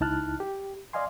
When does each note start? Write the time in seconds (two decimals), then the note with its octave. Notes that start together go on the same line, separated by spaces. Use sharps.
0.01 C#2 D#4 E4 A5 F6 F#6
0.40 G4
0.93 D5 D#5 F5 G#5 C6